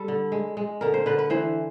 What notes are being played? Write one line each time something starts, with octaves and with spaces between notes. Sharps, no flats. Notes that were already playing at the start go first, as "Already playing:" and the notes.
Already playing: G3 A4
D3
G#3
G#3
D3 A#4
C5
D3 B4
B4
E3 C5